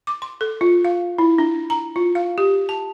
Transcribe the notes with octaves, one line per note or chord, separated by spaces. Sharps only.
D6
C6
A4
F4
F5
E4
D4
A#5
F4
F5
G4
A5